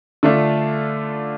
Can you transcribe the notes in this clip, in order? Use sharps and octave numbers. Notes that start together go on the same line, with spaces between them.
D3 A3 D4 F4